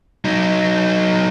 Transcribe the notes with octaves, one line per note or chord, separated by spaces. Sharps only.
F#3 D#4